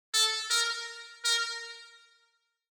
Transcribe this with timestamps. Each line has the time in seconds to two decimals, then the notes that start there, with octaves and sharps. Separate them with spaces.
0.14 A4
0.50 A#4
1.25 A#4